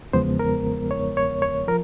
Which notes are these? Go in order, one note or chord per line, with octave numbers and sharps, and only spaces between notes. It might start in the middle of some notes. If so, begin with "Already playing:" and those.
E2 C#3 F3 G#3 B3 C5
A#4
C#5
C#5
C#5
F3 A#4